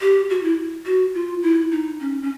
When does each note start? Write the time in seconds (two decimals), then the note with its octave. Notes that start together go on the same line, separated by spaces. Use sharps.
0.01 G4
0.30 F#4
0.43 E4
0.86 F#4
1.14 F4
1.43 E4
1.71 D#4
2.00 C#4
2.22 C#4